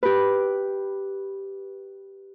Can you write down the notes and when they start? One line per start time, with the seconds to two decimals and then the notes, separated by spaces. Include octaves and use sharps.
0.03 G4 B4